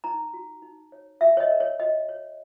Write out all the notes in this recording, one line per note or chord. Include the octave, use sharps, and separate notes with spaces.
D#4 A#5
F#4
D#4
C#5
F#4 E5
C#5
D#5
A#4
C#5
F#4 D#5
C#5